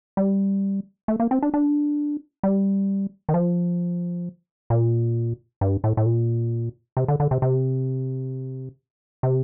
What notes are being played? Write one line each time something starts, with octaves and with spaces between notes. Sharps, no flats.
G3
A3
A#3
C4
D4
D4
G3
D#3
F3
A#2
G2
A2
A2
A#2
C3
D3
D3
C3
C3
C3